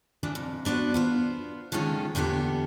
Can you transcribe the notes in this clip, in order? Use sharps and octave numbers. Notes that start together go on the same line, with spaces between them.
E3 F3 D4
F2
B3 D4 F#4 C5
B3 F4 C5
D3 D#3 F3 G#3 C#4 F4
E2 A#2 D3 B3 G4